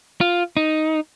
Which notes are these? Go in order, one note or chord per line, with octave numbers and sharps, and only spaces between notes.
F4
D#4